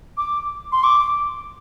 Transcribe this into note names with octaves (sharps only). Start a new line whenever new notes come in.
D6
C6
D6